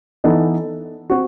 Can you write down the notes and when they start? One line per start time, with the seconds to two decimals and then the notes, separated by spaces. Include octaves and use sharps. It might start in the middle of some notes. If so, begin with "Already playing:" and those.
0.24 E3 B3 D#4 A4 D#5
1.10 C4 F#4